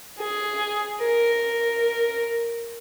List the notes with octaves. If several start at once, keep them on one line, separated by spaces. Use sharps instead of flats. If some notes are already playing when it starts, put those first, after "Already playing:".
G#4
A#4